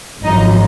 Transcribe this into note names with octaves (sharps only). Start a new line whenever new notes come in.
G#1 F#2 F3 D#4 D#5